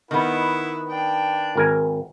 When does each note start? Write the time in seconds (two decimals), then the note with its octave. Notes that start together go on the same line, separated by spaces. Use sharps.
0.11 D#3 B3 E4 B4 F#5
0.89 D4 G5
1.56 G#1 A#4 G#5